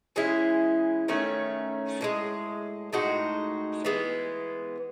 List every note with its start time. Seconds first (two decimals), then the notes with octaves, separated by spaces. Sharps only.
0.16 E3 G#3 C#4 E4
1.08 D#3 A3 C#4
2.01 A2 E3 G#3
2.93 A2 G#3 D#4 F#4
3.85 E3 G#3 B3